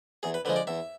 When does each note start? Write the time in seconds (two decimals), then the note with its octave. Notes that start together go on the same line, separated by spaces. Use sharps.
0.23 E2 G#4
0.34 B4
0.45 D3 F3 G#3 B4
0.56 D5
0.67 E2 E5